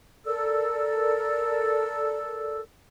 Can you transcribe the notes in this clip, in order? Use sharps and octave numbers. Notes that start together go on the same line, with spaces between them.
A4 A#4 D5 E6